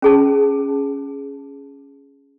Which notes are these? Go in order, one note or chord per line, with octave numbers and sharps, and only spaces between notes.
C#4 G#4 A5